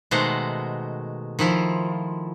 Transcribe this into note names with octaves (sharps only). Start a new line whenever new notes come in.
B2 D#3 G#3 A3 C5 F#5
D#3 F3 E4 F4